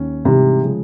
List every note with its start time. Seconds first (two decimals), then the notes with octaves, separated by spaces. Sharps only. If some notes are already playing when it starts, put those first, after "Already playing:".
Already playing: D#2 C#4
0.25 G#2 C3 E3 G3
0.62 C#3 F3 G#3